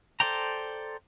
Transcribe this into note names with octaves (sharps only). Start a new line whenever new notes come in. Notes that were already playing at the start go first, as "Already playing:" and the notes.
A4 C5 D5 G5 A#5